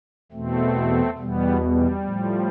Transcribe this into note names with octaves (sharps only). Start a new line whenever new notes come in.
E2 B2 A3 C4
E2 B2 G3 B3
G3
A2 F3